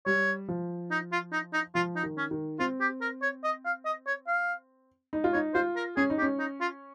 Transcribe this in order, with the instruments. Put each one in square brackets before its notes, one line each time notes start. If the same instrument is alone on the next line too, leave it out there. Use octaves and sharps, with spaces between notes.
[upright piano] G3 [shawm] C#5
[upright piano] F3
[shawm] D#4
F4
D#4
D#4
[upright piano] F3 [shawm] F4
[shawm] D#4
[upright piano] D#3
[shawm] C#4
[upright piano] D#3
[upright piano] C4 [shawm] F4
[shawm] G4
A#4
C#5
D#5
F5
D#5
C#5
F5
[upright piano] D#4
F4
[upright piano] D#4 [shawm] C#5
[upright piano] F4 [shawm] C5
[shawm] A#4
[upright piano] C#4 [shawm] G#4
[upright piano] D#4
[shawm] G4
[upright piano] C#4
[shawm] D#4
F4